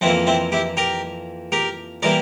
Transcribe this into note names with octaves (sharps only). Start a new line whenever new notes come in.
F2 E3 A#3 C4 E4
C4 E4
E4 G4
G4 A#4
G4 A#4
E3 G3 A#3 A#4 D5